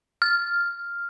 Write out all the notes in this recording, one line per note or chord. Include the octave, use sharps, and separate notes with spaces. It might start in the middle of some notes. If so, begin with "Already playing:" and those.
F6